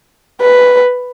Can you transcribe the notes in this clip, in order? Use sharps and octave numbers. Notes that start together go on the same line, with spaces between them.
B4